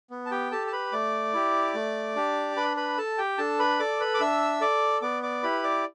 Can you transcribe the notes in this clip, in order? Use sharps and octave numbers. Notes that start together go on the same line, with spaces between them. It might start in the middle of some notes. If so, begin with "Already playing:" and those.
B3
A5
G4 G5
G4 A4 A5
A5
B4 B5
A3 D5 D6
E4 G4
A3
D4 G4
D4 B4 B5
B4 B5
A4 A5
G4 G5
D4 A4 A5
B4 B5
A4 D5 D6
B4 B5
D6
D4 E5 E6
A4 D5 D6
B3 D5 D6
D5 D6
E4 G4 B4 B5
D5 D6